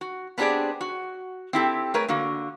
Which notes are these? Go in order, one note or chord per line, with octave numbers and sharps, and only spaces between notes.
F#4
B3 C4 D4 G4 G#4 D5
F#4
C4 E4 G4 A4
A3 G#4 A#4 B4 C#5
D3 A#3 F#4